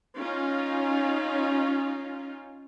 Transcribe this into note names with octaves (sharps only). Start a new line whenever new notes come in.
C#4 D#4 F4